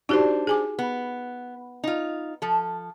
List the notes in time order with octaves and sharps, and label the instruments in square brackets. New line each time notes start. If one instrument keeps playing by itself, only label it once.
[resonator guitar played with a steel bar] D4 C5 [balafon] D#4 F#4 G4
[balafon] G#4 G#5 D6
[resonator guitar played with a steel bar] B3
D#4 F4
F3 A4